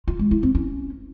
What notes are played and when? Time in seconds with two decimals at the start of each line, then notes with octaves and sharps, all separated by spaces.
0.08 F4
0.19 G#3
0.31 E4
0.43 C4
0.55 C#4